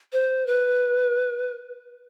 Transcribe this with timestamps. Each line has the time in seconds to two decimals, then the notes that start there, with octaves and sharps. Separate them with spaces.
0.13 C5
0.47 B4